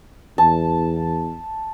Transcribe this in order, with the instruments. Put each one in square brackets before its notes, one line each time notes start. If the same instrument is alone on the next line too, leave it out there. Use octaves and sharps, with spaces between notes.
[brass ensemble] E2 [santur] A5